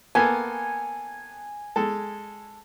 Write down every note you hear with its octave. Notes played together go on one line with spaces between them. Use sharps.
A#3 B3 A4 G#5
G#3 A4